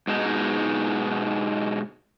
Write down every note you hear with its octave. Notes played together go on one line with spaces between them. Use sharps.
G#2 B2 G#3 D#4